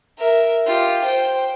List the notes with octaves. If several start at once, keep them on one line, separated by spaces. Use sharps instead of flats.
A#4 E5
F4 G4
C5 G5